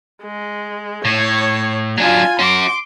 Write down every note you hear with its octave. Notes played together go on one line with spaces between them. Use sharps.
G#3
A2 C#5
F#3 D4 F4 G#5
C#4 F#4 C6 D6